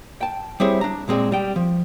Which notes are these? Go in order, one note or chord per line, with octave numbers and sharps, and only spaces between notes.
G5 A5
G3 C4 E4 G#4 C5 C#5
D4 A#5
A#2 G#3 C4 G#4 D5
G3 G5
F3